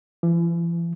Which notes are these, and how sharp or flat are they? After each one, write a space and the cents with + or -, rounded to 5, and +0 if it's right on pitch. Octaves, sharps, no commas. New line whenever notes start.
E3 +45